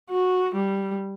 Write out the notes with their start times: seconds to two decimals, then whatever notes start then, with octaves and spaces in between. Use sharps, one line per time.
0.11 F#4
0.55 G3